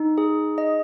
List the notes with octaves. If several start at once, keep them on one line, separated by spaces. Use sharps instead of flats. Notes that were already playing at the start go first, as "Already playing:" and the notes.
Already playing: D#4
G#4
D#5